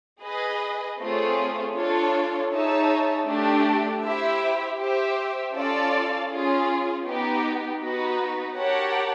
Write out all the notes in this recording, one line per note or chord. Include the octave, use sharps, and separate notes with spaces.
G#4 B4 D#5
A3 C4 F4 G#4 C#5
D4 F4 A4 C#5
D#4 G#4 C#5 E5 A5
A3 D4 G4
E4 G4 C5 E5
G4 C5 E5
C#4 F4 A4 D5 F5
C#4 F4 G#4
B3 D#4 G4
B3 D#4 F#4 B4
G4 A#4 C#5 F#5 A5